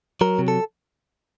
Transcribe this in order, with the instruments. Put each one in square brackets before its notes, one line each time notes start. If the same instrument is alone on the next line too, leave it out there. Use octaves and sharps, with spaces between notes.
[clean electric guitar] F#3 A#4
C3
A4